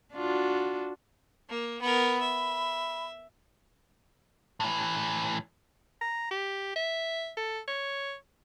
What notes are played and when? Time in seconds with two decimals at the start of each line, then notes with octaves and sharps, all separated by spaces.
0.13 D4 F4 F#4
1.49 A#3
1.82 B3 A#4 B5
2.20 E5
4.60 A2 E3
6.01 A#5
6.31 G4
6.76 E5
7.37 A4
7.68 C#5